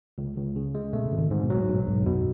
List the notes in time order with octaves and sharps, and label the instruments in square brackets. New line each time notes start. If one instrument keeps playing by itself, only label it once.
[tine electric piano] C#2
C#2
C#3
G#3
[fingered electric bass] B2 [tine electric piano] A3
[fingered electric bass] C#3
[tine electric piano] G#1
[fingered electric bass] D#3
[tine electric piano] G#2 [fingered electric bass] D#3
[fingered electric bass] B2
[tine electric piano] F#3
[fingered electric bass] A2
[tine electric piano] B1 [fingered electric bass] G#2
[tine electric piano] B1 [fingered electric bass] G#2
[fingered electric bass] E2
[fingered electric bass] F#2 [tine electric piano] B2